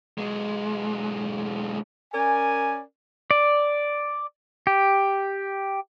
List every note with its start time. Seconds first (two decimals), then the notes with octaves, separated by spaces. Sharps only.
0.18 B1 G#3
2.14 C#4 A#4 D5 G#5
3.31 D5
4.67 G4